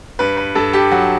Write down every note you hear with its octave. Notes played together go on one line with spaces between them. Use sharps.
G2 B4
B4
G2 A4
G4
F#3 F#4